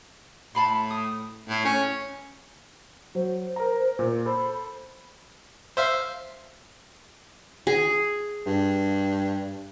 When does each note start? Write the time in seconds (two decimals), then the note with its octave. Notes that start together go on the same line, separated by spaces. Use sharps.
0.55 A2 A5 B5 C6
0.90 D#6
1.49 A2
1.65 C#4
3.15 F#3 C5
3.56 A#4 A#5
3.99 A#2
4.26 A4 C5 B5
5.77 C5 E5 F5
7.67 G#4
8.46 G2